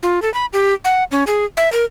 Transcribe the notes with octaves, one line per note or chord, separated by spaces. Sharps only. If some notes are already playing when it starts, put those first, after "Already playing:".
F4
A4
B5
G4
F#5
C#4
G#4
E5
A#4